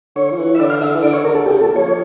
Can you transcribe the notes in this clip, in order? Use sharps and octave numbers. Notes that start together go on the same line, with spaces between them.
D3 C#5
F3
E3
E5
D3 D5
F5
D3 E5
E3
D3 D5
C#5
D3 A#4
A4
C#3 G4
A#2 A4
F3 C#5